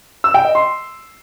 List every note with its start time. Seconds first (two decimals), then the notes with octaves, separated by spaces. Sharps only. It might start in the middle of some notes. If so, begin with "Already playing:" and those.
0.24 E6
0.34 G5
0.45 D#5
0.55 C6